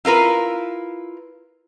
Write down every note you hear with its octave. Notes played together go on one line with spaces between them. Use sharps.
E4 F4 A#4 B4